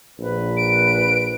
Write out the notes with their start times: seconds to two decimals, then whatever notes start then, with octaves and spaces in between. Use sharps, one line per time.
0.19 A#1 B4
0.57 D7